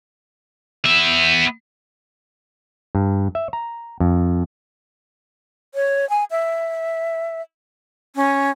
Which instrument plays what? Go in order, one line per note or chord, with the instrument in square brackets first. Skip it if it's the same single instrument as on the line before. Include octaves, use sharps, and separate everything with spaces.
[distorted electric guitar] B3 E5
[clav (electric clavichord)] G2
E5
A#5
F2
[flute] C#5
G#5
E5
C#4